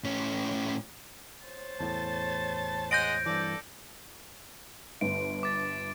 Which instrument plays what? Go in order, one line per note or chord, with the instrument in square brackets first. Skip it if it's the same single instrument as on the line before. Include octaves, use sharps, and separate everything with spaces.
[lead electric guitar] A2 C#4
[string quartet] C5 C#5 A6
[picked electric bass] E2 A2 [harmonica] A5
[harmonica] G#3 D#5 F#5 [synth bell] G6 A#6 D7
[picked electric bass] G2 E3 [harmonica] A4 D5
[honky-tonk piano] G1 [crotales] D7
[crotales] D6 A6